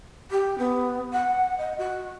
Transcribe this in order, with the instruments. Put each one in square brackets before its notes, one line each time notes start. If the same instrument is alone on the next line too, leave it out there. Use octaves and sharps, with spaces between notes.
[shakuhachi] G4
B3
F#5
D#5
F#4